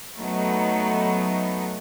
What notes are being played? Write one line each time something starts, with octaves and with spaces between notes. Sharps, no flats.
F#3 A3 B3 D#4